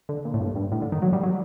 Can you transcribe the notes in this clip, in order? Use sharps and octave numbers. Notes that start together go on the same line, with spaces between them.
D3
A#2
A2
G2
G2
A2
D3
D#3
F#3
G3
F#3